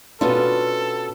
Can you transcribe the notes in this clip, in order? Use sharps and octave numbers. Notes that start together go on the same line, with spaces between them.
B2 B3 C#4 D4 F4 A4